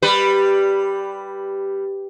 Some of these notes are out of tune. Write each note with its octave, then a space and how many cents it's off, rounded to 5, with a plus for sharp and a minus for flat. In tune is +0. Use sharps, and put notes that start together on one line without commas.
G3 +0 B4 +5